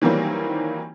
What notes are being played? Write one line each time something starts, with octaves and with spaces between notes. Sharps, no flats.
D#3 E3 F#3 G3 A#3 C4